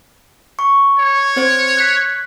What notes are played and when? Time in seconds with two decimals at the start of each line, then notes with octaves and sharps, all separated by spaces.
0.59 C#6
0.99 C#5
1.36 C4 C5 G#6
1.77 F#6 G#6 B6